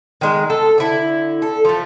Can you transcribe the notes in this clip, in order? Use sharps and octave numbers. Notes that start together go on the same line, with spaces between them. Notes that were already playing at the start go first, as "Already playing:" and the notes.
D#3 G#3
A4
D3 E4
A4
F3 A3